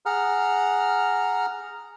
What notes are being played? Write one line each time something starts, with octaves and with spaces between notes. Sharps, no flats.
G#4 F#5 A#5 F6